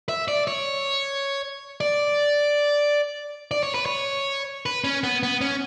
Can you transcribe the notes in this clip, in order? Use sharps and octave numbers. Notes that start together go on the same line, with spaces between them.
E5
D5
C#5
D5
D5
C#5
B4
C#5
B4
C#4
B3
B3
C#4